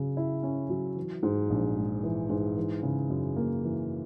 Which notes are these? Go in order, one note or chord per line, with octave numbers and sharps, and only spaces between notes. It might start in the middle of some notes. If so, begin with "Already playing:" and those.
Already playing: C#3 F#3
E4
C#4
F#3
E3
G#2
A#1
G#3
E3
G#2
E3
C#3
F#2
A#3
E3